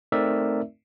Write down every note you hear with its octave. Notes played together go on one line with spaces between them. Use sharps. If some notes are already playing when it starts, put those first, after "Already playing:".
A3 C4 D#4 A#4 D5 E5